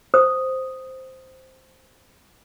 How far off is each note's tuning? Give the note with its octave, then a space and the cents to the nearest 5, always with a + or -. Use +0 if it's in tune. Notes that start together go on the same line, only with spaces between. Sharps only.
C5 +0 D#6 +0